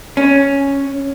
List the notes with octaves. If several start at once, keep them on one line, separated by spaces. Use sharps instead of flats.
C#4